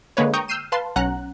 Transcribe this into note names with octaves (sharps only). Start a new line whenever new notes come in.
D3 G#3 A#3 B4 C#5
G5 A#5 C#6 D#6 G6
E6 F6 G6 C7 D#7 E7
B4 F5 A5 C6
B1 C#4 F#5 A#5 F#6